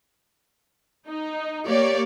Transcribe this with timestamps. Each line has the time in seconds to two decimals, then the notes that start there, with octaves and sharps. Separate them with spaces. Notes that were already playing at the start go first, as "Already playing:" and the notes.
1.07 D#4
1.67 A#3 G4 C#5 D5